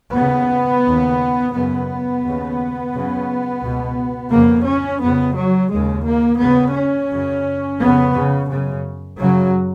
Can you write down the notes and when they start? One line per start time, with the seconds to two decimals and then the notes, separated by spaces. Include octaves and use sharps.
0.14 D#2 C#3 B3
0.85 D#2 C#3
1.53 F#2 C#3 B3
2.24 D#2 C#3
2.93 F#2 C#3
3.63 C#2 B2
4.32 F2 C#3 A#3
4.67 C#4
5.01 F2 C#3 B3
5.36 F#3
5.71 D#2 C#3 G#3
6.05 A#3
6.41 D#2 C#3 B3
6.75 C#4
7.11 F#2 C#3
7.79 F2 C#3 B3
8.14 C#3
8.50 F#2 C#3
9.18 F#2 C#3 F#3